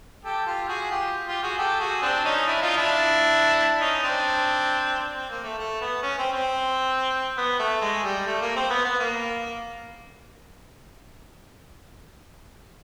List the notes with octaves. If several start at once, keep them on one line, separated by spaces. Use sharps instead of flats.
G4 A4
F4 G4
F#4 G#4
F4 G4
F4 G4
F#4 G#4
G4 A4
F#4 G#4
C4 D4
C#4 D#4
D4 E4
D#4 F4
D4 E4
C#4 D#4
C4 D4
C4
A#3
A3
A3
B3
C#4
C4
C4
B3
A3
G#3
G3
A3
A#3
C4
B3
B3
A#3